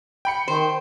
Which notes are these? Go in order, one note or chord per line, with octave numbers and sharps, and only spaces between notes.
G5 B5 C#7
D#3 C5